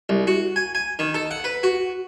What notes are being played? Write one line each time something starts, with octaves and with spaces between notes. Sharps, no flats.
C2
F#4
G#5
G#5
D#3
A4
F#5
B4
F#4